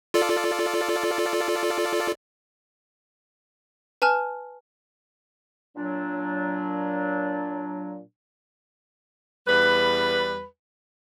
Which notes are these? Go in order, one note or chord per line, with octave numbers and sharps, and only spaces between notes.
F4 A4 D5
B4 G#5 A5 F6
A#2 F#3 D4
E2 G3 B4